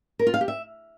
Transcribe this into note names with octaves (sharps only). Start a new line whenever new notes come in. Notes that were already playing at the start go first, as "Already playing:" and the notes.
A#4
F4
F5
G4
E5